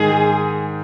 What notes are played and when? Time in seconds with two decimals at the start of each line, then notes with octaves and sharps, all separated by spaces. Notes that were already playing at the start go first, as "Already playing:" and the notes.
Already playing: G#2 D#3 G#3 G#4